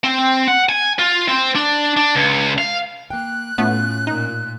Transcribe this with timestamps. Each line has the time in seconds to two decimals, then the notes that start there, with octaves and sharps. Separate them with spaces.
0.04 C4
0.47 F#5
0.69 G#5
0.99 F4
1.28 C4
1.55 D4
1.96 D4
2.15 C#2
2.58 F5
3.10 A#3 G5 F#6
3.58 A2 A3 B3 C#4 F4
4.07 A#2 D#4